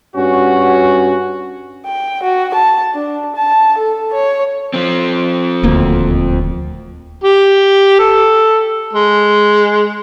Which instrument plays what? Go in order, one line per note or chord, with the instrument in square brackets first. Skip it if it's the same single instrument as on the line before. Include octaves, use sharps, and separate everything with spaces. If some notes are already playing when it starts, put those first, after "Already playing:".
[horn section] G2 C#4 F#4
[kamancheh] G5
F#4
A5
D4
A5
A4
C#5
[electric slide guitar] F3 C4
[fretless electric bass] D#1 D2 A#3
[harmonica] G4
A4
G#3